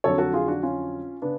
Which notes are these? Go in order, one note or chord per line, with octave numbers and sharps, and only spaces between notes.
F2 D3 F#3 A4 C#5
F#4 A4
F4 G#4
D4 F#4
C#4 F4
C#3 B3 D4